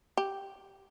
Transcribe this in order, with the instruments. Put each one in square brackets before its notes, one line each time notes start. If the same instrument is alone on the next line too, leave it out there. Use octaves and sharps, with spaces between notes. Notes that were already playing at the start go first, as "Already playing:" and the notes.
[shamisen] G4